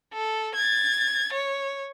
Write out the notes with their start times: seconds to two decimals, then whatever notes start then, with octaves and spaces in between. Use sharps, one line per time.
0.13 A4
0.55 G#6 A6
1.33 C#5